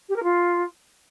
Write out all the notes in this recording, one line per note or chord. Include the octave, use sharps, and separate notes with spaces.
G4
A#4
F4